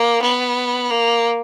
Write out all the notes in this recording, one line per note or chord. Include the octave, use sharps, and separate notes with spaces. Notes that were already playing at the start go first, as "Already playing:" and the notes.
Already playing: A#3
B3
A#3